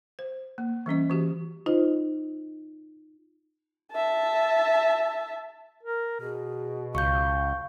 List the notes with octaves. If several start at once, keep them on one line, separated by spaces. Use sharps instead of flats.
C5
A#3
E3 G3 C#4 D#5
E3 F#4 G4
D#4 F4 C5 D#5
E5 A5
A#4
B2 G#4
C#2 F5 C#6 G6